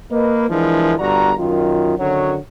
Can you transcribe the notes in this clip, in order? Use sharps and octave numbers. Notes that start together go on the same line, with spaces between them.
A#3 B4 D#5
E3 F3 G#3 D4 E4 A#4
G1 G2 F#4 D5 A#5
F#2 D#3 F4
D3 D#3 F#3 C#4 F#4 C#5